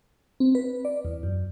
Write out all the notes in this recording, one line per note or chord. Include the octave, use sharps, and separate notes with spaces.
C4
B4
D5
E2
F#2